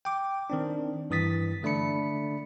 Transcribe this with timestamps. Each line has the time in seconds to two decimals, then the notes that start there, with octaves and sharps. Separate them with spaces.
0.05 G5 D6
0.50 D#3 C4 D4
1.10 G2 E3 D#6 A6 B6
1.63 D3 A3 D4 B5 C#7